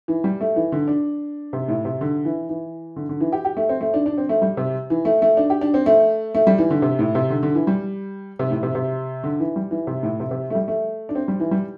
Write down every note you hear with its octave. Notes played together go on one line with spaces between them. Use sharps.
E3
G3
A3
E3
D3
D4
C3
A2
C3
D3
E3
E3
D3
D3
E3
G4
G4
A3
C4
A3
D4
D4
C4
A3
G3
C3
E3
A3
A3
D4
G4
D4
C4
A3
A3
G3
E3
D3
C3
A2
C3
D3
D3
E3
G3
C3
A2
C3
C3
D3
E3
G3
E3
C3
A2
C3
C3
A3
G3
A3
D4
C4
G3
E3
G3